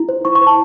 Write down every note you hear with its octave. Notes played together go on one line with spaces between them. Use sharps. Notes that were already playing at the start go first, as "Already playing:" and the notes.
Already playing: E4
C5
E4 C#6
C#6
C5
A5